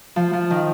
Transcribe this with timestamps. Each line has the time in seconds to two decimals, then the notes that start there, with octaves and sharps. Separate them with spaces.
0.16 F3
0.33 F3
0.50 D#3